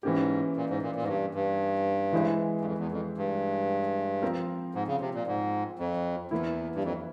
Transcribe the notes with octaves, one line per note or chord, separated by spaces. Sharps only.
G#2 E3 A#3 C#4 G4
A#2
G#2
A#2
A#2
G#2
G2
G2
E3 G#3 E4 G#4 C5
G2
F2
E2
F2
G2
F3 C4 F4 A#4
G#2
C#3
C3
A#2
G#2
F2
E2 E3 A#3 E4
G2
F2